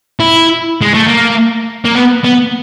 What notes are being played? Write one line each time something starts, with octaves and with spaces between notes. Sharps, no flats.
E4
G#3
A3
A#3
A#3
B3
B3